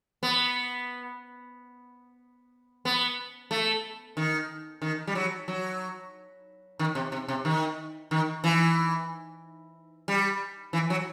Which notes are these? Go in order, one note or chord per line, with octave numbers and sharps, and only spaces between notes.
B3
B3
A3
D#3
D#3
G3
F#3
F#3
D#3
C3
C3
C3
D#3
D#3
E3
G3
E3
F#3